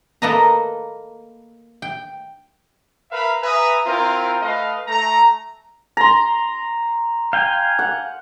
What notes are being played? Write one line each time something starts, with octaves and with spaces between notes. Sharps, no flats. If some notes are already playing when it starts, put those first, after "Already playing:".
A#3 A4 B4 D#5 A5 A#5
G5
A#4 B4 E5 F5 B5
B4 E5 G#5 A#5 D#6
C4 E4 F4 A#4
A3 B4 D#5 F5
A3 A#5
A#5 C6
F5 G5 G#5
F#5